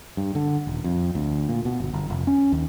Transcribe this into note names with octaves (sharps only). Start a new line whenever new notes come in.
G2
D3
D#1
F2
D2
A#2
B2
G1
G1
F1
C#4
D#2